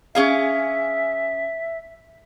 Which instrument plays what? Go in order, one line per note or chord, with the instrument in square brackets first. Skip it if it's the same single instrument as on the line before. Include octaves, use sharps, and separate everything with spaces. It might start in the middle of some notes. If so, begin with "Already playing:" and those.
[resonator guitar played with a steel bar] C#4 G#4 F5 [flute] E5